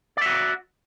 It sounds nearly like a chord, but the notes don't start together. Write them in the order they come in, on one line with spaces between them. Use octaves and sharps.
D5 E5 F#4